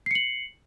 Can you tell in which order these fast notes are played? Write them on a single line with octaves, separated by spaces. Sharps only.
C7 C#7 F#7